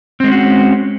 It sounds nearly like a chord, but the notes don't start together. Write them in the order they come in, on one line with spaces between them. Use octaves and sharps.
C4 G#3 C#4 F#4